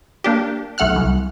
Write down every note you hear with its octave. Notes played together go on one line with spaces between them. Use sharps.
A#3 D4 G4
B1 A3 F#5 F6 F#6
C2